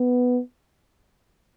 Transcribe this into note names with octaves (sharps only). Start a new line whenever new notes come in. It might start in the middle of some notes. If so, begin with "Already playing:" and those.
Already playing: B3